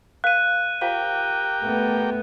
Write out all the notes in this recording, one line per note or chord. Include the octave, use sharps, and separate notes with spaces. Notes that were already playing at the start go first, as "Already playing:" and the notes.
A#4 F5 F#6 D#7
F4 G4 A#4 C5 F5 G5
A3 B3